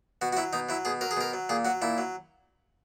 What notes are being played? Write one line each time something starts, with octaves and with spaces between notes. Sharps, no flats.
B2 F#4
F#4
F#3 E4
B2 D#4
F#3 E4
B2 G#4
F#3 A#4
G#4
B2 A#4
F#3
A#2 G#4
F#3 F#4
A#2 E4
F#3